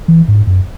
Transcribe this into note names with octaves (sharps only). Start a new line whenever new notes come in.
E3
G#2
F#2